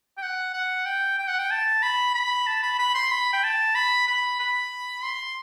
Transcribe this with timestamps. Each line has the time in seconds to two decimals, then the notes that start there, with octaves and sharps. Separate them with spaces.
0.18 G5
0.22 F#5
0.54 F#5
0.86 G5
1.18 G5
1.28 F#5
1.39 G5
1.51 A5
1.83 B5
2.14 B5
2.47 A5
2.63 B5
2.79 B5
2.95 C6
3.12 B5
3.33 G5
3.44 A5
3.75 B5
4.07 B5
4.40 B5
5.04 C6